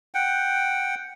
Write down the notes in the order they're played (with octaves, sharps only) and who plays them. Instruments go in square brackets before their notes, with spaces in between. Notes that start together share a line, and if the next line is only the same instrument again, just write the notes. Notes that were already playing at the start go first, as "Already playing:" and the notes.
[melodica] F#5 G5